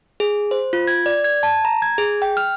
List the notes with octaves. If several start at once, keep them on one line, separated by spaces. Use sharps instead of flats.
G#4
C5
F4
G#6
D5
G#6
A5
A#5
G#6
G#4
G5
F6